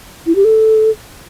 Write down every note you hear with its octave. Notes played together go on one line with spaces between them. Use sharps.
E4
G4
A4